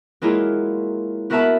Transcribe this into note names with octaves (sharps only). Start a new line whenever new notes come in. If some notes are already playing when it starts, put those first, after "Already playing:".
F#3 G#3 A#3 E4 F4
B3 F#4 A#4 E5 A5 B5